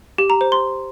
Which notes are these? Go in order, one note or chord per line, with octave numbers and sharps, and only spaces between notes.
G4
A#5
C5
C6